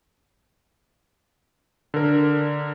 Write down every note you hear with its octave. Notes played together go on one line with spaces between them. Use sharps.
D3 A#4